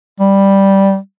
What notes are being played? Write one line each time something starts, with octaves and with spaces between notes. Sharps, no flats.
G3